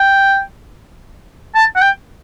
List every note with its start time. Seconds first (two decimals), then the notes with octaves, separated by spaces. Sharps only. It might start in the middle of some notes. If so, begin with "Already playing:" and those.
Already playing: G5
1.55 A5
1.75 F#5
1.82 G5